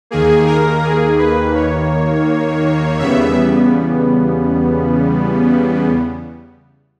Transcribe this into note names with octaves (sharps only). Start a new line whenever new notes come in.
D#2 D#3 A#3 G#4
A#4
G#4
B4
C#5
E2 C#3 G3 B3 E5